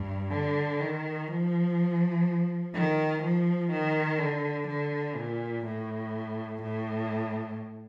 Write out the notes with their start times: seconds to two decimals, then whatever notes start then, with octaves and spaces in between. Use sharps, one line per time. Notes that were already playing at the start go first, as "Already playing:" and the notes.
Already playing: G2
0.31 D3
0.80 D#3
1.28 F3
2.74 D#3
3.23 F3
3.71 D#3
4.19 D3
4.68 D3
5.16 A#2
5.65 A2
6.62 A2